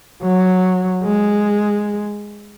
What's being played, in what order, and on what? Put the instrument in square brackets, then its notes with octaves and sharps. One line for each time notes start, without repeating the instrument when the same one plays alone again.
[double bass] F#3
G#3